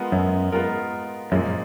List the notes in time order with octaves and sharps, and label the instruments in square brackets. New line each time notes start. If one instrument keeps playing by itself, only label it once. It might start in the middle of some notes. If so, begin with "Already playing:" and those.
Already playing: [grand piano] G#3 B3 F4 A#4
[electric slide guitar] F#2
[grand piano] G#3 B3 F4 A#4
[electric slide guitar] F#2 [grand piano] A#2 F3 G#3